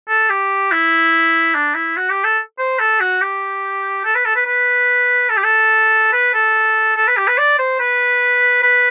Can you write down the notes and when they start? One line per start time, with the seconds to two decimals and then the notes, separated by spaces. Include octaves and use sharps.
0.08 A4
0.29 G4
0.72 E4
1.55 D4
1.75 E4
1.97 F#4
2.10 G4
2.24 A4
2.59 C5
2.80 A4
3.00 F#4
3.21 G4
4.05 A4
4.15 B4
4.25 A4
4.36 B4
4.46 B4
5.30 A4
5.37 G4
5.44 A4
6.13 B4
6.34 A4
6.96 A4
7.07 B4
7.17 G4
7.27 B4
7.38 D5
7.59 C5
7.80 B4
8.63 B4